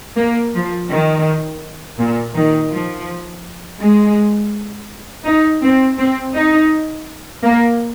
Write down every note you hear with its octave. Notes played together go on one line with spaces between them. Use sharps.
A#3
F3
D#3
A#2
D#3
F3
G#3
D#4
C4
C4
D#4
A#3